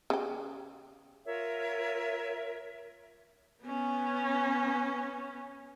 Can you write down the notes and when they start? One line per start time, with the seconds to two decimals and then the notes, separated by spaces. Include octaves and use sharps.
0.10 C#3 G4
1.25 F4 A#4 C#5 E5
3.64 B3 C#4